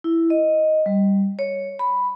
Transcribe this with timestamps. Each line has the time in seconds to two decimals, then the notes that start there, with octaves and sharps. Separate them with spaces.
0.04 E4
0.30 D#5
0.86 G3
1.39 C#5
1.79 B5